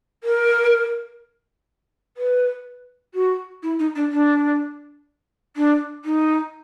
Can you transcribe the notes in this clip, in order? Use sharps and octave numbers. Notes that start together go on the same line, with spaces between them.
A#4
B4
F#4
E4
D#4
D4
D4
D4
D#4